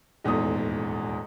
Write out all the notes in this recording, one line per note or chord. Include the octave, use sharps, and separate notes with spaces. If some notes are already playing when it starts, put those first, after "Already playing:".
D#1 E2 G#2 A3 D#6